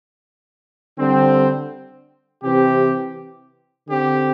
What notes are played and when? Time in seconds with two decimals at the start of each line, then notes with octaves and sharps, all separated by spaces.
0.98 D3 G3 C4
2.42 C3 E3 C4 G4
3.87 D3 C4 G4